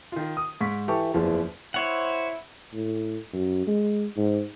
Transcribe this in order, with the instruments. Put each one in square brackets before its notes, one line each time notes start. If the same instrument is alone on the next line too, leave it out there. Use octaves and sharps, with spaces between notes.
[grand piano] D#3 F4
D#6
G#2 C#6 B6
[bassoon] E3 [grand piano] G4 A4 C#6
[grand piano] F#1 F3 [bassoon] E2
[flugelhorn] E4 [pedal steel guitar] C5 C#5 F#5
[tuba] A2
F#2
G#3
G#2